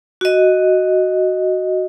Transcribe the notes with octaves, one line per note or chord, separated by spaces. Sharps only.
F#4 D#5